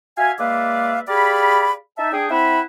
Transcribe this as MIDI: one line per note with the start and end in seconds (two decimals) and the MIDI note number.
0.18 0.32 66
0.18 0.32 76
0.18 0.32 77
0.18 0.32 80
0.39 0.99 56
0.39 0.99 58
0.39 0.99 71
0.39 0.99 74
0.39 0.99 76
0.39 0.99 77
1.07 1.72 67
1.07 1.72 68
1.07 1.72 74
1.07 1.72 77
1.07 1.72 83
1.97 2.10 63
1.97 2.10 76
1.97 2.10 81
2.12 2.26 62
2.12 2.26 68
2.12 2.26 79
2.30 2.60 60
2.30 2.60 64
2.30 2.60 76
2.30 2.60 78
2.30 2.60 83